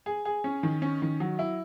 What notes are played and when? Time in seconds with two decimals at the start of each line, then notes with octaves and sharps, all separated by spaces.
0.06 G#4
0.25 G#4
0.44 C#4
0.63 D#3
0.82 C#4
1.02 D#3
1.20 F#3
1.39 E4